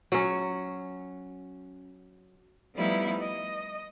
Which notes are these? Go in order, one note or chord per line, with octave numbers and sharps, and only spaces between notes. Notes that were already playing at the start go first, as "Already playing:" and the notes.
F#3 C#4
F3 G3 A3 B3 D#4 E4
D#5